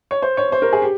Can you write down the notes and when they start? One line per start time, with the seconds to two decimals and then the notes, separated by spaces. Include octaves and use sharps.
0.11 C#5
0.22 C5
0.37 C#5
0.52 C5
0.62 A#4
0.73 G#4
0.82 G4